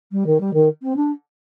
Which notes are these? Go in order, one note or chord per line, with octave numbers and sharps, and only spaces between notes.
G3
D#3
G3
D#3
C4
D4